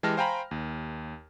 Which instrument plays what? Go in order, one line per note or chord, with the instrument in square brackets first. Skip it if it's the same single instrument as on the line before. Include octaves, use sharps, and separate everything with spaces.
[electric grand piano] E3 G#3 G4 A5 F6 A#6
C5 F5 G5 G#5 A#5 B5
D#2